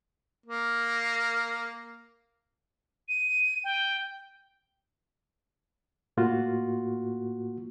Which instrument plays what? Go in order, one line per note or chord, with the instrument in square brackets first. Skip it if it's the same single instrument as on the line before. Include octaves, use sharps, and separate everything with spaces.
[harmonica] A#3
[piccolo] D#7
G5
[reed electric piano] A2 A#3 F4 F#4